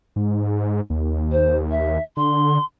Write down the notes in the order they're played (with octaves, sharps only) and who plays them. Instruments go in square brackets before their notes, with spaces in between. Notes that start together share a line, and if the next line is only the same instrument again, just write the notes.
[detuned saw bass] G#2
D#2
[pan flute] C5
E5
[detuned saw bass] D3 [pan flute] C6